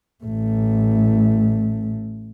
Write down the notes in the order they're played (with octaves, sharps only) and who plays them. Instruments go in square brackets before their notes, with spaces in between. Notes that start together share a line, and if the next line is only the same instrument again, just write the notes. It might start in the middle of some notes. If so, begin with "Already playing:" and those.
[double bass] A1 A3